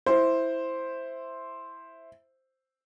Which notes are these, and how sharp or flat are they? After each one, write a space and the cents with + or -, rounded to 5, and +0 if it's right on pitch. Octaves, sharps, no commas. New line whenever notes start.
E4 +0 C5 +0